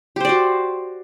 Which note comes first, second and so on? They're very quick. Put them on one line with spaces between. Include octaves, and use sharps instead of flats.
G4 C5 D5 F#4